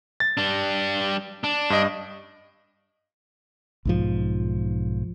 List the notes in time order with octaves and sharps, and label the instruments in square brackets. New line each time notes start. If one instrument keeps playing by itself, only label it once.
[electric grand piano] A6
[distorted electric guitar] G3 D4
D4
[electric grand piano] G2 D#5
[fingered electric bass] B1 G#2 F3